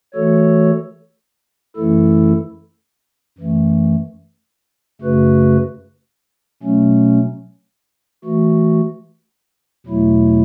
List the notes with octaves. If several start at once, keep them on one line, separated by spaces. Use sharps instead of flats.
E3 A3 F#4 A4 C#5
F#2 E3 A3 E4 A4
F#2 E3 A3
F#2 C#3 A3 F#4 B4
B2 F#3 A3 C#4
E3 A3 F#4
E2 B2 F#3 A3 E4